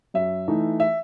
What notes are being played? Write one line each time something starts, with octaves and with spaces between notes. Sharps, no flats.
F#2 E5
E3 A3 D#4
E5